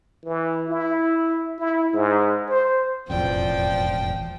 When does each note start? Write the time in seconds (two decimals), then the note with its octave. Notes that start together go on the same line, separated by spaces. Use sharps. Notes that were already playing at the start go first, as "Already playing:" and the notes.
0.24 E3
0.69 E4
1.59 E4
1.94 G#2
2.48 C5
3.10 E1 A1 F2 F3 D5 G5